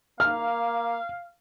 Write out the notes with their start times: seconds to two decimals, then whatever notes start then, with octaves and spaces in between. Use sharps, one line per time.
0.20 A#3 F5 F6